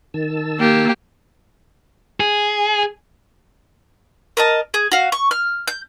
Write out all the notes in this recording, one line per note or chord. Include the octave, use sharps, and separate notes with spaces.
D#3 A5 E6
A#3 G4
G#4
A#4 D#5 A5
G#4
F#4 F5
C#6
F6
G6